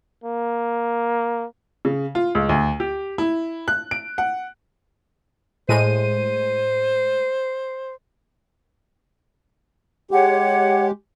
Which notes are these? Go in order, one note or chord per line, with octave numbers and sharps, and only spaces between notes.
A#3
C#3
F4
C#2
D2
G4
E4
F#6
D7
F#5
A2 G#3 C5 D#7
G#3 G4 C#5 F#5